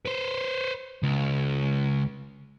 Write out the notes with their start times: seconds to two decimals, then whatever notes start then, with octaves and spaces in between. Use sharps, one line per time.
0.06 B4 C5
1.03 C#2